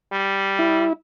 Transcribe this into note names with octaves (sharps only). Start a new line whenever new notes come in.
G3
E4